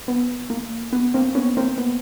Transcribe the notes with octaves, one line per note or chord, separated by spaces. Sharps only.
B3
A#3
B3
A#3 C4
B3 C#4
A#3 C4
B3